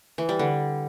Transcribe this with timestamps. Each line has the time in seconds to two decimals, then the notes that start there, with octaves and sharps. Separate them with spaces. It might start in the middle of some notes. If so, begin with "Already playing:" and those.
0.18 E3
0.29 G3
0.39 D3